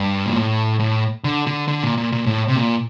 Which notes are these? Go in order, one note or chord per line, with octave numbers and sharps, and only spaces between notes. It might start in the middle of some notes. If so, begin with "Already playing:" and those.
Already playing: G2
A#2
A2
A2
D3
D3
D3
A#2
A#2
A#2
A2
C3
A#2